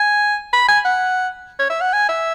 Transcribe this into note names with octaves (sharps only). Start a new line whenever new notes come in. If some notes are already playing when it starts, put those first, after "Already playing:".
Already playing: G#5
B5
G#5
F#5
C#5
E5
F#5
G#5
E5